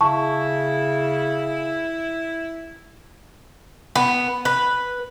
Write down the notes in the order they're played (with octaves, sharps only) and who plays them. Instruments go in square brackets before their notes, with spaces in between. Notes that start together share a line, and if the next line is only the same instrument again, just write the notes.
[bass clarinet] C#3 [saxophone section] E4 [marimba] A5 C#6
[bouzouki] B3
B4